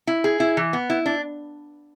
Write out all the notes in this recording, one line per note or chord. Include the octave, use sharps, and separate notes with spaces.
E4
G#4
E4
E3
B3
E4
D4